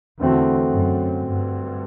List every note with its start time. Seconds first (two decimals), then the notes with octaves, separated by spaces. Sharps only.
0.20 E2 D3 A3 C4 F#4
0.70 F#2
1.20 G2